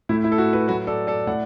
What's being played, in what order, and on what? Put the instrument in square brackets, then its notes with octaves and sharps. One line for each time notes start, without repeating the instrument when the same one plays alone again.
[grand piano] A2 A3 E4
E4
A4
F#4
F#4 B4
A2 F#3 A3 F#4 B4
A4 D5
A4 D5
A2 D5 F#5